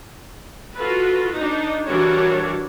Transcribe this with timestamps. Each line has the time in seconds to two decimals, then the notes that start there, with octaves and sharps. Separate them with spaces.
0.75 F4 F#4 A4 B4
1.35 D4 D#4
1.86 E3 G3 D4 F#4 A#4 C#5